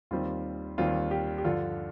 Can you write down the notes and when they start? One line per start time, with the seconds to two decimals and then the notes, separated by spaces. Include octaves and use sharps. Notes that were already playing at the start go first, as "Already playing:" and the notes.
0.11 D#2 D#3 G3 C4 F4
0.78 D#2 D#3 G3 C4 F4
1.11 G4
1.38 G4
1.44 G2 D3 F3 F4